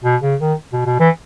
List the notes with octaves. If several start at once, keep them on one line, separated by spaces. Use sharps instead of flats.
B2
C#3
D#3
B2
B2
E3